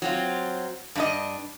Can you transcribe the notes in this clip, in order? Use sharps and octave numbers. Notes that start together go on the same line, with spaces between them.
F#3 C4 F4
G2 D4 D#5